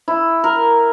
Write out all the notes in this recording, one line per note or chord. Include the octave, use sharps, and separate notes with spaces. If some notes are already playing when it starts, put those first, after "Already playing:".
E4
A#4